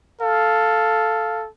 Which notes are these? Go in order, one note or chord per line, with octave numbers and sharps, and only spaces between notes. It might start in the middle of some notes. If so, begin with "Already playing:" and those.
A4 F5